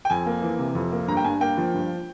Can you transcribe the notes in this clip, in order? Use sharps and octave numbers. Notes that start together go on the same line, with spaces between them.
G5
F2 G#5
A#3
E3
C3
F2
A#3
G2 A#5
G5
G2 G#5
A#3 G5
F3
G2